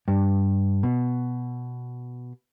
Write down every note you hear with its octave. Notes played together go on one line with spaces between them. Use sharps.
G2
B2